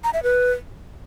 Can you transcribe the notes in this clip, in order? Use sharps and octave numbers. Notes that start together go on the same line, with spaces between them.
A#5
E5
B4